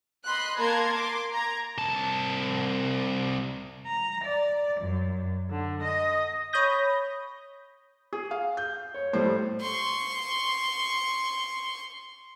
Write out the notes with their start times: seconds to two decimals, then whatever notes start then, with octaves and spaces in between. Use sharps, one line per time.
0.25 D#5 B5 C6 F#6
0.58 A#3 A#4 A5 A#5 C6 G#6
0.94 C6 D6
1.33 A#5 G#6
1.78 C2 A5
3.86 A#5
4.24 D5
4.80 F#2
5.49 D3
5.81 D#5
6.53 C#5 B5 D#6 G6 A#6
8.13 G#4
8.31 F5
8.57 G6
8.94 C#5
9.13 A2 G3 C5
9.61 C6 C#6